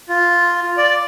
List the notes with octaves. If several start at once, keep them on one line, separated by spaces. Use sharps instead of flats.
F4
D5